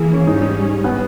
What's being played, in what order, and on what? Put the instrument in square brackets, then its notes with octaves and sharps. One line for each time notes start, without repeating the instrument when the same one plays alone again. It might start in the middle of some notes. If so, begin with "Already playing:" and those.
Already playing: [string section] E3 A#3 E4 [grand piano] G#4
[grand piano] C#4
[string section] G#2 G3 C#4 [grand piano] D#4
[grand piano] D#4
B3